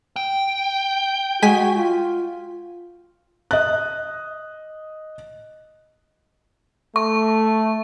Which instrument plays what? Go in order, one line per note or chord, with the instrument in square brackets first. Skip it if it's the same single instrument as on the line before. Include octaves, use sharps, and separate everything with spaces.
[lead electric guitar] G5
[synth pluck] G#3 G#5 B6 [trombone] F#4
[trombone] F4
[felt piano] D#5 F#6
[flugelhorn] A3 [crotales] C#6